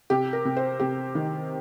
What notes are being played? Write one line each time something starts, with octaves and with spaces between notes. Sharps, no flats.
C3 G4
A#4
C3
C5
C3 G4
D#3